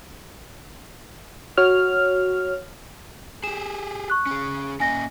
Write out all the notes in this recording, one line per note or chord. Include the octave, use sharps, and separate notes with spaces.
F#4 C#5 F6
G4 G#4 E7
C#6 F#6
C#4 G#4
A#3 C#4 D#5 G#5 A#6